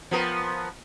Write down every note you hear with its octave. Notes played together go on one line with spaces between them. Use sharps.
F3 B3 A#4